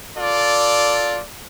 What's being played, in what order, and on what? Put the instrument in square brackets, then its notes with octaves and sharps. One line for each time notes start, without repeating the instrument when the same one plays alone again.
[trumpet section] F4 A4 D5